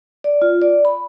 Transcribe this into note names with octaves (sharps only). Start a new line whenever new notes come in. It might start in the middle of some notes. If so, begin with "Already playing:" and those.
D5
F4
D5
B5